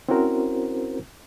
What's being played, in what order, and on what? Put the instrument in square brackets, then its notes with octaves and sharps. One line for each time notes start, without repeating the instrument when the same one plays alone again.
[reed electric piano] C4 C#4 E4 F#4 A#4 C5